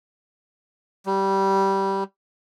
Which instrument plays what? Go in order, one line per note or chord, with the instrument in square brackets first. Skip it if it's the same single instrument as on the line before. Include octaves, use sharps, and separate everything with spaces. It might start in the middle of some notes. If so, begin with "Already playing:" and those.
[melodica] G3